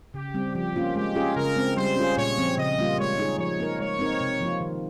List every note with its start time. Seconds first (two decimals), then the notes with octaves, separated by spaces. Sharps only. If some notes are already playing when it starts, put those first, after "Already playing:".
0.14 C#3 G4
0.34 G3 C4
0.55 F3 G4
0.76 A#3 C#4 F4
0.95 G#3 G4
1.15 C#4 F4 G#4
1.36 C#3 A#4
1.56 G#3 C4
1.77 G3 C5
1.96 C#4 F4 G#4
2.17 A#2 C#5
2.38 F3 C4
2.58 C#3 D#5
2.78 G3 A#3 F4
2.98 G#3 C#5
3.19 D#4 G#4
3.38 F3 C#5
3.59 A#3 D#4 A#4
3.79 G#3 C#5
3.99 C4 D#4 A#4
4.21 C3
4.40 F3 A#3 F4
4.60 D#3